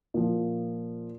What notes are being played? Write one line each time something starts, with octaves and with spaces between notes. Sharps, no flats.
A#2 F3